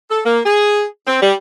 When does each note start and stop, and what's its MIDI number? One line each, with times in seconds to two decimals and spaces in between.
0.10 0.19 69
0.25 0.41 58
0.45 0.83 68
1.07 1.18 60
1.21 1.35 55